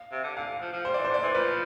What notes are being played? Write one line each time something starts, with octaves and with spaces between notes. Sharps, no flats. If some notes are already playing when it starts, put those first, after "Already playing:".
Already playing: F5
C3
D3
D3 F5
F3
F3
G3 C5
E3 D5
C5
D3
D5
E3 C5
F3 B4